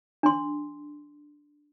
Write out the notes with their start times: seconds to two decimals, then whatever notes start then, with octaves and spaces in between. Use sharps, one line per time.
0.23 D4 C6